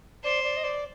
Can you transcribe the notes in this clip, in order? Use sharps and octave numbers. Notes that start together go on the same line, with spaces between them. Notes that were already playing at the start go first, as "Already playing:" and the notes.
C5 D5
D5
D#5
D5